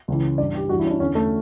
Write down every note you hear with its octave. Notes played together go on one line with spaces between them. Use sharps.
C#2 C#3 E3
G2 E3 D5
G4
G2 E3 F#4
E4
C#4
D4
E2 D3 C#4
A3